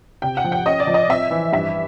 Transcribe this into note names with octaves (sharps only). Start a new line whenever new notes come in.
C3 G5
F#5
F3
G5
C#4 D#5
D5
F3
D#5
C4 E5
E3
G2 E5